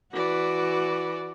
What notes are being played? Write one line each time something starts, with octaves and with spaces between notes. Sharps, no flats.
E3 F#4 D5